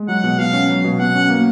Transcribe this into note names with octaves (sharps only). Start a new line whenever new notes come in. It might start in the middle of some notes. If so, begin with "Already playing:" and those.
Already playing: G#3
F#3 F#5
B2
B2 F5
C#4
F#3
B2
B2 F#5
C#4
A#3